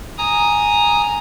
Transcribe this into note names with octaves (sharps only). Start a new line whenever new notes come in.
G#5 A#5 D#6